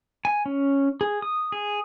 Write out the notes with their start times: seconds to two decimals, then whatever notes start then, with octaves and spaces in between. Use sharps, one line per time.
0.25 G#5
0.46 C#4
1.01 G#4
1.22 D#6
1.52 G#4